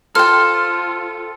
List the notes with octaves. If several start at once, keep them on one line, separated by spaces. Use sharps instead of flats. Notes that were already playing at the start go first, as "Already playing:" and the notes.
F4 A4 C5 G5 F6